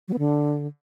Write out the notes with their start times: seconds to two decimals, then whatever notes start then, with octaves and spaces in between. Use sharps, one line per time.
0.08 F#3
0.13 B3
0.18 D3